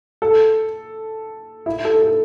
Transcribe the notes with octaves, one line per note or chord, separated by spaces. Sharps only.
A4
E4
A4
A4